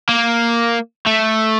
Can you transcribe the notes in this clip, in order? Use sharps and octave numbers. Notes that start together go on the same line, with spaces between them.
A#3
A3